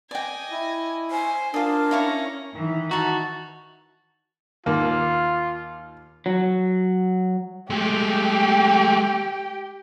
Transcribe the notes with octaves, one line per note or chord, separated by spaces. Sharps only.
D5 D#5 G5 G#5
E4
C5 G#5
D4 F4 A#4 D#6
C#4 E4 F5 A#5 C#6
D#3 E3
D#4 F#4 C#5 A5
D#2 A#3 F4
F#3
G#3 A3 G4